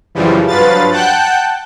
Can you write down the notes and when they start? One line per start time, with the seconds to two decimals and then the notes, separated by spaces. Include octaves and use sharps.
0.15 F#2 C#3 E3 F3 G3
0.47 G2 F3 F#3 B4 F5 A6
0.91 F#5 G5 A5 F#6 G6